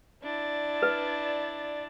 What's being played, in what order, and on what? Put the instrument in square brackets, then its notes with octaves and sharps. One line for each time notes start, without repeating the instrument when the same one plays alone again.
[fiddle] D4 [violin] E4 A6 [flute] D5
[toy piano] B4